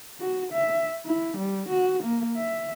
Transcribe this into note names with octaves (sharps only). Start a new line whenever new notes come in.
F#4
E5
E4
G3
F#4
A#3
E5